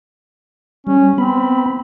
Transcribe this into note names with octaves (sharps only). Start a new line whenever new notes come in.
G3 C#4
B3 C4 B5